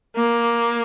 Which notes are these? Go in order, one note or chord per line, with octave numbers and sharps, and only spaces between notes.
A#3